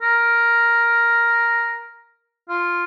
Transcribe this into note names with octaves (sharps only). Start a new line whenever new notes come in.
A#4
F4